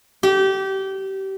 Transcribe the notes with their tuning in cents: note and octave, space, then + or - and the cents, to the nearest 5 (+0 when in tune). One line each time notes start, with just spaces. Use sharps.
G4 -25